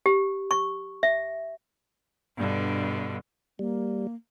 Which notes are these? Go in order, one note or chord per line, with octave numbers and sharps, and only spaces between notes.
G4
C#6
E5
G2 B2 D3
G3 A#3